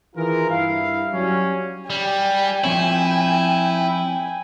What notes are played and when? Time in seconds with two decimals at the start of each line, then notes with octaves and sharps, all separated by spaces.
0.15 D#3 E3 F4 G#4 A#4
0.49 G2 E4 F5
1.13 F#3 G3 C#4
1.90 G3 G5 G#5
2.64 F3 C4 E4 C#5